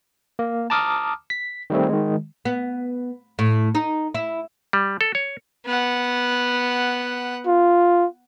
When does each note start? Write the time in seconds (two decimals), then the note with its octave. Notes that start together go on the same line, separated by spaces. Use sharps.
0.39 A#3
0.70 A5 A#5 D6 D#6 F6
1.30 B6
1.70 D#3 G3 A3 C4
1.89 D#3 G#3
2.45 B3
3.39 A2
3.75 D#4
4.15 E4
4.73 G3
5.01 A4
5.15 C#5
5.66 B3 F#5
7.47 F4